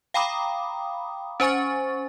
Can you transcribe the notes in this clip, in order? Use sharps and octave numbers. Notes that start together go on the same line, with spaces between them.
F5 G5 A#5 B5 D6 D#6
C#4 C5 G#5 C#6 A6